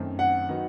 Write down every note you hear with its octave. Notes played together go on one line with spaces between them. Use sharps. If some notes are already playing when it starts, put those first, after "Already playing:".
Already playing: F#2 D#3 A3 C4
F#5
D#3 F#3 B3 D#4